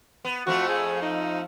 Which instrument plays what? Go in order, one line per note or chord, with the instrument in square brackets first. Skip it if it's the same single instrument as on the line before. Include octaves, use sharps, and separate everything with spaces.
[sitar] B3
[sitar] F2 F3 A3 [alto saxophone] F#4
[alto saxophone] G#4
D#4